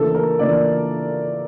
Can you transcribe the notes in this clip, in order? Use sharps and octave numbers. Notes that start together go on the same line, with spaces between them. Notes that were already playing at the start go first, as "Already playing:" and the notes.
Already playing: C#3 E3 A#3 D4 F4 A4
A#4
C#3 E3 A#3 D4 F4 D5